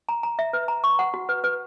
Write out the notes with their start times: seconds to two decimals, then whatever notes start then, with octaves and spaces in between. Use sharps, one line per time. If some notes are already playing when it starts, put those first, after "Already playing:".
0.09 A#5
0.23 A#5
0.39 E5
0.53 B4
0.68 A#5
0.84 C#6
0.99 F#5
1.14 F#4
1.29 B4
1.44 B4